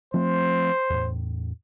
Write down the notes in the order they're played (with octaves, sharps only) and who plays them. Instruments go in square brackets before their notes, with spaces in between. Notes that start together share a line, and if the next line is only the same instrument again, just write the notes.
[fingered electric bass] F3 A3 C4 [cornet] C5
[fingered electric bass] E2 A2